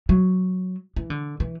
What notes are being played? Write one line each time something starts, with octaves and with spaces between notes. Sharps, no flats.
F#3
E3
D3
E3